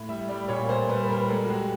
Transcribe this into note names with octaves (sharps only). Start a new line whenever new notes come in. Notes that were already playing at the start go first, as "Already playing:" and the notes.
Already playing: A2
G3 E5
G3 D5
A#2 C#5
A#2 C5
G3 B4
B4
G3 A#4
G#3 A4
F#4
G#3 G4